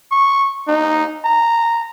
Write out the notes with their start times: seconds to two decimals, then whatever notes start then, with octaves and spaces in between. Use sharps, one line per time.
0.11 C#6
0.67 D#4
1.25 A#5